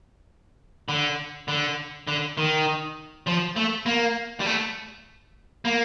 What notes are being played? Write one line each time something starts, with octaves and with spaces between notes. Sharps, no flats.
D3
D3
D3
D#3
F3
A3
A#3
G3
A3
A#3